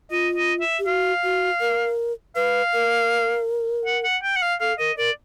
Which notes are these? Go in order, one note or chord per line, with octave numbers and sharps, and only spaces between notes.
F4 D#5
D#5
E5
G4
F#4 F5
F#4
A#4
B4 F5
A#4
F#5
F#5
G5
F#5
F5
A4 F5
A#4 D#5
A#4 D5